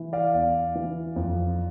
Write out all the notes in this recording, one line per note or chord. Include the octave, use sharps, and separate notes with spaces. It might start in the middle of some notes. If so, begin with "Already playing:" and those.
Already playing: E3
D5 F5
E2
E3
F2